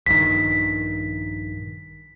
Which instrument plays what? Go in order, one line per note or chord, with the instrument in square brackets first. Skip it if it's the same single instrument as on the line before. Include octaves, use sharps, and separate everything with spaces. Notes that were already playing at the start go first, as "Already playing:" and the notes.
[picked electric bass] A#1 G2 D#3 [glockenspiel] B6